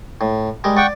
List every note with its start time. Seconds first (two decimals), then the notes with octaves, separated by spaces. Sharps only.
0.21 A2
0.64 G3 G#3 A#4
0.77 D5 F#5 G5 C#6